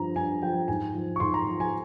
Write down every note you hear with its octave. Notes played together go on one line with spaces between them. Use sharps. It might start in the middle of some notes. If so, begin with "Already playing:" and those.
Already playing: G2 F3 A#5
G2 G#5
F3 G5
G#2 G#5
F3
C#6
G#2 C6
A#5
F3
G#5